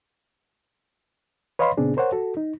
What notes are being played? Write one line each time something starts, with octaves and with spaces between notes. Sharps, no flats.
B4 C#5 D#5 F5 B5 C6
A#2 C#3 B3 C4 D4 G#4
A#4 C5 C#5 F#5
F#4 A4
D#4